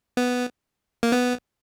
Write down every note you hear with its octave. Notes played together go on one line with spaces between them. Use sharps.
B3
A#3
B3